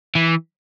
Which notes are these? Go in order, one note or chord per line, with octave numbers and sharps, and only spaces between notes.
E3